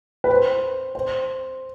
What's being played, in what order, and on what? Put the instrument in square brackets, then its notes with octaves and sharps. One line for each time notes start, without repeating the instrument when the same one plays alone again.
[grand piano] B4
C5
C5